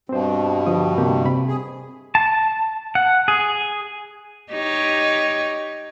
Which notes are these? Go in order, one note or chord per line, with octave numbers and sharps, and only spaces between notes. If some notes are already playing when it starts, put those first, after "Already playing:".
G2 B2 C4 C5
D3 F3 D#6
C3 A#3 G4
C3 B5
G#4
A5
F#5
G#4
D#4 G4 C#5